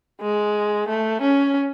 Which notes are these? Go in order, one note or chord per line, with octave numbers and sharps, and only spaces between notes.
G#3
A3
C#4